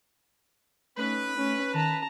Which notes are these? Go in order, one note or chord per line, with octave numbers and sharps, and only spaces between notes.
A3 C#4 D#4 B4
C#4
D#3 B4 A5 A#5